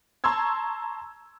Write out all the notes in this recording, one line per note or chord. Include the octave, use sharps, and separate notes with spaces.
A5 A#5 C6 C#6 E6 G#6